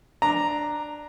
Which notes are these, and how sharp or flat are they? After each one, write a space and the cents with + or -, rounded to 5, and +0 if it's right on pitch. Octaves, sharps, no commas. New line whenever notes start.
D4 +10 A#5 +0